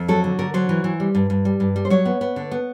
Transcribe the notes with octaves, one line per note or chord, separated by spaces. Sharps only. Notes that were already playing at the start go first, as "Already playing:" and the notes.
Already playing: F2
F#3 A4
D3
D3 A#4
F#3 C5
E3
E3
G3
G2
G2
G3
G2
G3
C5
F#3 C#5
B3
B3
D3
B3